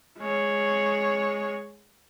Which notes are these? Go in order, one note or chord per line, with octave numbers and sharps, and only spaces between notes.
G#3 C#5